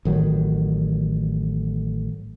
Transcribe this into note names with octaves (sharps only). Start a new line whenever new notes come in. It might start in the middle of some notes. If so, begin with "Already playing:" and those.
A1 D#3 F#3